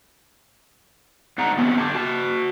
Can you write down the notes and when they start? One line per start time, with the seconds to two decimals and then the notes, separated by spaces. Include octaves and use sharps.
1.38 G#2 D4 F#5 A#5
1.57 C3 F3 B3 C#4 F#4
1.78 D3 G4 A5
1.95 F#4 A5